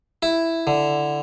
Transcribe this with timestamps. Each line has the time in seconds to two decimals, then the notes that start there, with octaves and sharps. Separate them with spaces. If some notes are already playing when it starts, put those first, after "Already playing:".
0.22 E4
0.67 D3